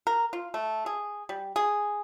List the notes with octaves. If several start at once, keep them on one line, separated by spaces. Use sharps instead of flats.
A#4
F4
A3
G#4
G3
G#4